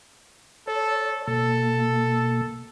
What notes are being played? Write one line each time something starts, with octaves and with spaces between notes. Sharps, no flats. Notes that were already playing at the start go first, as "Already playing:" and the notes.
A4 C#5
B2 A#3 A4